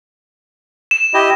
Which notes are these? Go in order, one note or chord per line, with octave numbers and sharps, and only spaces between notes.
E7
E4 G4 D#5